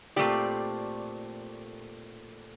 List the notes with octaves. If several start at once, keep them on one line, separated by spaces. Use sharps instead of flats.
A#2 A3 C4 G4 D5